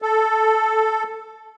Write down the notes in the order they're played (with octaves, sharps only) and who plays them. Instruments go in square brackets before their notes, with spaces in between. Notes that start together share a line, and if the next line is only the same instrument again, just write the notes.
[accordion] A4